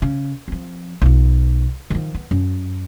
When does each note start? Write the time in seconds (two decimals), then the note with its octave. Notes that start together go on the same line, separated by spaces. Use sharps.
0.02 C#3
0.48 F3 C4
1.01 B1 F4
1.90 D#3 F3
2.15 B3
2.31 F#2